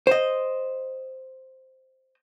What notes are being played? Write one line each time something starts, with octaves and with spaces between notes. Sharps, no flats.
C5 D#5